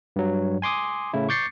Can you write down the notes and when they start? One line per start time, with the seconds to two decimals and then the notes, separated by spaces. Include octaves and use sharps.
0.16 G2 F#3
0.62 G#5 C6 D6 D#6
1.13 A2 C#3 E4
1.29 C#6 D6 G6 A6 C7 C#7